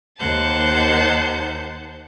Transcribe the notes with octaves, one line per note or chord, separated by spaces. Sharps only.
D#2 D#3 C5 F#5 A5 G6